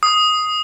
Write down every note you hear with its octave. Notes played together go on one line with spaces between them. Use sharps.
D#6